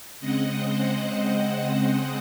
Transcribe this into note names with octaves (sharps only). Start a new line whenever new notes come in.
C#3 G#3 C4 D#5 F#5
C5 D#5
C5